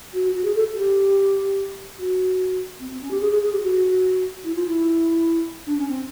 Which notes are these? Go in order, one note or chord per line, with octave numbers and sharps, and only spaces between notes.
F#4
F#4
G#4
A4
G4
F#4
C4
C4
C#4
G4
G#4
G#4
G#4
G4
F#4
E4
F4
E4
D4
C#4
C4